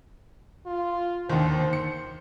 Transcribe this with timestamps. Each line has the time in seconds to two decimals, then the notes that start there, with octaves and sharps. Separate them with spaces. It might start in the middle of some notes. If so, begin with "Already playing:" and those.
0.66 F4
1.29 D#2 D3 D#3 C5
1.73 C#7